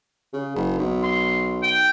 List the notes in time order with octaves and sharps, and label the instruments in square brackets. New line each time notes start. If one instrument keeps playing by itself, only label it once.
[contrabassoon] C#3
F#1
B1
[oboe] C6
G5